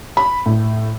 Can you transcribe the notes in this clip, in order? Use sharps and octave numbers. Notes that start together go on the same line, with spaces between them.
B5
A2